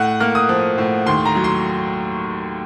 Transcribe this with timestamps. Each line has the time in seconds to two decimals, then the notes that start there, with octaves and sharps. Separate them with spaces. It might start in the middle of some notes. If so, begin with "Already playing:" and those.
Already playing: A2 F#5
0.20 A#3 F6
0.35 D#6
0.49 F3
0.78 A2
1.06 D#2 C6
1.26 A#5
1.35 F#3
1.44 C6